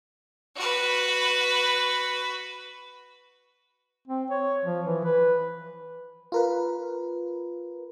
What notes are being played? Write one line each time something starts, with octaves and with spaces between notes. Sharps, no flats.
F#4 B4
C4
C#5
F3
E3
B4
F4 A#4 B4